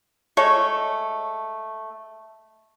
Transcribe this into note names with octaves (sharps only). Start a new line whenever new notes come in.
G#3 A3 A4 C#5